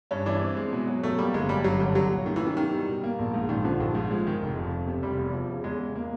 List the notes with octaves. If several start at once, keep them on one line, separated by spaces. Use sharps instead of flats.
G2 C#4
E3 D4
C4
G#3
B2
F#3
B2 A3
G3 A#3
G1 G#3
F#2 G3
G1 F#3
D3 G3
C2 F#3
A#2
D#3 A3
E3
D#3 F#3
B2 D#3
G3
B2
A#3
A#1
G#2
A#1 D#3
D3 F3
A#1 D#3
G#2
F3 G#3
D#3
F1
F2
F1
C3
F1 G3
E2
F3
C#3
E2 G#3
C#3
A#3